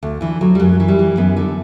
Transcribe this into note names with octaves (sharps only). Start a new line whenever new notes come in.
D2
D2 E3
D2 F#3
G3
F#2 F#3
E3
G3
E3
F#2 B3
D3